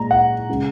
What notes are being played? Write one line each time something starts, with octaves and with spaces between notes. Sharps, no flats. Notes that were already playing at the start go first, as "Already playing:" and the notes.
Already playing: A#2 G#3 A#5
F#5
C#3 G#3